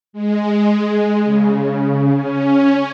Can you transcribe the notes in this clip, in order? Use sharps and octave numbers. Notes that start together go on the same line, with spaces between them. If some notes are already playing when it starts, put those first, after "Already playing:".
G#3
C#3
C#4